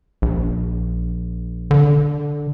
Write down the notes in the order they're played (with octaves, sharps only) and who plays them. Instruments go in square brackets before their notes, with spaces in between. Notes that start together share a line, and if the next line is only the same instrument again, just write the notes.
[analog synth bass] A#1
D3